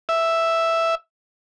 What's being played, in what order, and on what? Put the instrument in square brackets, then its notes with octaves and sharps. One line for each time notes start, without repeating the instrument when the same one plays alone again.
[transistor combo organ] E5